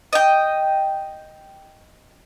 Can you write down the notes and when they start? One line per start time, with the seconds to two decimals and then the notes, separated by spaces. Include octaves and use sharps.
0.13 D#5 G5